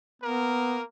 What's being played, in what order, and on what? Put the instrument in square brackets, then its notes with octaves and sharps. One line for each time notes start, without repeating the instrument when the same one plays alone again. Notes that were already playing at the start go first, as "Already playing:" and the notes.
[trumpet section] A#3 A#4 [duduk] B3